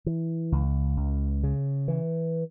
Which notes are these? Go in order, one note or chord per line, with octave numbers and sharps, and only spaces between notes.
E3
C#2
C#2
C#3
E3